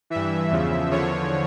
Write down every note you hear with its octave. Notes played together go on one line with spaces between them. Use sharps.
G2 E3 E5
E2 C#3 F3
E2 D3 F3 C#5